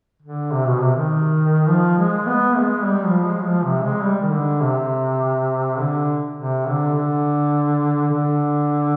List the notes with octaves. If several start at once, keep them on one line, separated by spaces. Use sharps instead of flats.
D3
C3
B2
C3
D#3
F3
G#3
B3
G#3
G3
F3
G#3
F3
C3
G#3
G3
D#3
D3
C3
D3
C3
D3
D3
D3